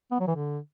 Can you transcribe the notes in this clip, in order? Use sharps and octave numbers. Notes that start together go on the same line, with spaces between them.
B3
F#3
E3
D3